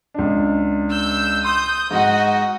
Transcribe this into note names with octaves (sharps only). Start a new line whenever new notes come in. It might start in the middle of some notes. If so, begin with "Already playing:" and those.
C#2 D4
E6 G6
C6 D#6 G6
G#2 F#4 D#5 F#5